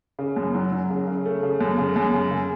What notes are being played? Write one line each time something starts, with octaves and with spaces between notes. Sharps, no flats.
C#3
F#2
F#3
F#3
C#3
C#3
A3
C#3
F#2
C#3
F#2
C#3
C#3